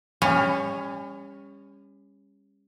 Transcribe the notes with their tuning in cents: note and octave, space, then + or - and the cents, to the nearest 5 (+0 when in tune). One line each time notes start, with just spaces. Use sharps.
G3 +40 C#4 +0